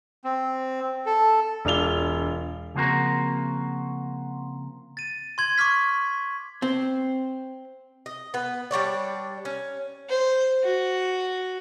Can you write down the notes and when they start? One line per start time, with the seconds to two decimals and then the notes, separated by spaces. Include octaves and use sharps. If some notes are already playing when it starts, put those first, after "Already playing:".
0.24 C4
1.06 A4
1.65 E1 D4 F4 F7 G7
2.75 C#3 F3 A#3 C4 F#4 A#4
4.97 A6 D#7
5.38 C6 G#6 F#7
5.58 C#6 D6 F6 B6
6.62 C4
8.06 D#5
8.34 B3 B4
8.71 G3 D4 C#5 D5
9.45 C#4
10.10 C5
10.64 F#4